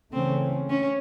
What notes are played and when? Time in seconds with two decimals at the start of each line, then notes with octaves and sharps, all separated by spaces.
0.13 C#3 E3 A3 C4 C#4
0.69 C#4